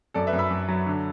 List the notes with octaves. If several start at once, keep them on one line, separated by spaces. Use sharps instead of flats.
F#2 A4 D5
B4 E5
F#2
B5 E6
F#2
F#3
D3